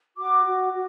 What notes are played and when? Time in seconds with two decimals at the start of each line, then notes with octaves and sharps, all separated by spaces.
0.16 F#4 D6
0.45 F#4
0.73 F#4